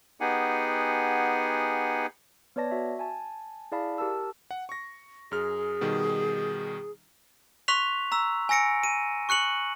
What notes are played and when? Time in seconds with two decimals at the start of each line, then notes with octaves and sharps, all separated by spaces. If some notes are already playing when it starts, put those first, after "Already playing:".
0.21 B3 D#4 G4 G#4 F#5 G#5
2.56 B3 B4 C#5 D5 A5 A#6
2.71 F#4 E5
2.99 G#5 A5
3.72 E4 G#4 D5 F5 A5 B5
3.98 G4 A#4 A5 E6
4.51 F#5
4.69 C#6 A#6
5.32 F#2 G#4 F6
5.81 B2 D#3 G3
7.68 C6 C#6 F#6 B6 F7
8.12 A#5 E6 B6
8.49 G#5 E6 A#6 C#7 D7
8.83 D#7
9.29 C#6 F#6 C#7 F#7